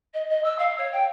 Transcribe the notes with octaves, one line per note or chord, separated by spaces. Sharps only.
D#5
D#5
E6
F5
C#5
G5